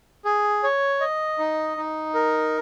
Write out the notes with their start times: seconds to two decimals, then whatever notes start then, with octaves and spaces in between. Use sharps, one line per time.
0.25 G#4
0.63 C#5
1.01 D#5
1.39 D#4
1.77 D#4
2.14 A#4